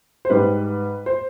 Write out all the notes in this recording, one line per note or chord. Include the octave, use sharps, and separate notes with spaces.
C5
G#2 G3 B4
C5